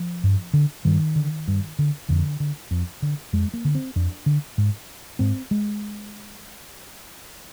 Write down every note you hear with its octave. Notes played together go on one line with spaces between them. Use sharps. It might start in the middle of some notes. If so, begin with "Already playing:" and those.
Already playing: F3
G2
D3
G2 D#3
D3
G2
D3
F2 D3
D3
F2
D3
F2 G#3
A#3
D3
C4
F2 D4
D3
G#2
G#2 C4
G#3